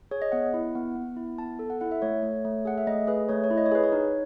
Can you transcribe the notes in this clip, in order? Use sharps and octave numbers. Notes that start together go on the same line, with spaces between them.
G#4 C#5
D#5
B3 F#5
E4
B3
B3
E4
B3 A5
A4
F#5
E4 F#5
E5
A3 C#5
A3
A3
G#4 F#5
E5
A3 D#5
G#4 B4
A3 C#5
C#5
E4
D#5
C#5
G#4 B4
C#5
D#4